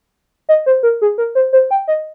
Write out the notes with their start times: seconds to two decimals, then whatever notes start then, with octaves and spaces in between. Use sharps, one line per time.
0.49 D#5
0.66 C5
0.83 A#4
1.02 G#4
1.18 A#4
1.35 C5
1.53 C5
1.71 G5
1.88 D#5